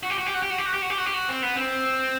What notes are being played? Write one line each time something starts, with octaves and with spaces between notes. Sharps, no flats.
F#4
G4
F#4
G4
F#4
G4
F#4
G4
F#4
G4
F#4
G4
F#4
G4
F#4
C4
B3
C4